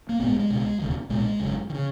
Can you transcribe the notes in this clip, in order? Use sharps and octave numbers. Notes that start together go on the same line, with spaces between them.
A#3
A#1 G#2 B3
G#3
G#3
C#2 B2
E1 D#2 C#3
B1 A#2 G#3
G#1 F#2 C#3
D#3
C#3